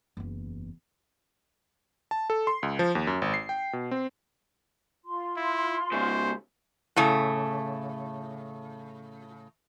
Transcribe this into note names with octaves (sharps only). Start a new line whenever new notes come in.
F#1 E2
A5
A4
C6
C#2
F3
D#2
F#2
G#1
C7
G5
B2
C4
F4 C6
E4
G#2 C#3 C5
A2 C#3 A3